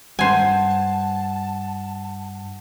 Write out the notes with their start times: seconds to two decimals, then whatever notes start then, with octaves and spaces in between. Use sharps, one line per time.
0.19 G2 C5 F#5 G#5 A5